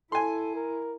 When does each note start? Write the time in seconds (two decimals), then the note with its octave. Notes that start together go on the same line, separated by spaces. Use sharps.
0.12 E4 A4 G#5 C6
0.55 A#4